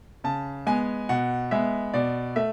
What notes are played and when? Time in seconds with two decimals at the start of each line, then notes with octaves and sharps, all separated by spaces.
0.24 C#3 A5
0.67 G#3 B3 G#5
1.09 B2 F#5
1.51 G#3 B3 E5
1.94 B2 D5
2.36 A3 E5